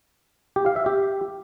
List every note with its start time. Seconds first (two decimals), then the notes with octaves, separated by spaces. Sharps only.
0.56 G4
0.66 F5
0.76 E5
0.86 G4